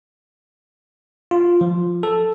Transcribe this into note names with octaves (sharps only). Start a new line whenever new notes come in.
F4
F3
A4